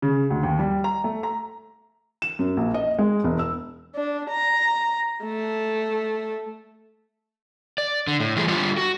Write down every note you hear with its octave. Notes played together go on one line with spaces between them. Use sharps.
C#3
D2
D#2
G3
A#5
A3
A#5
E7
F#2
A#1
D#5
G#3
E1
E6
D4
A#5
A3
D5
D3
A2
E3 G3 A3 F4 G#4
D3 G3 F4 A4
F#4